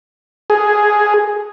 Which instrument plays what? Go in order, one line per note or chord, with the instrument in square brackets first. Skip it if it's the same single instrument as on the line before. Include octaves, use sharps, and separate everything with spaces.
[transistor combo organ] G#4